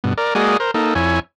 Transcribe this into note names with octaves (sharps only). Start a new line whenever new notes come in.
G2 B2
A#4 D5
G#3 A#3 F#4 G#4 D5 D#5
A#4 C5
A#3 D#4 A4
F2 E4 C#5 G#5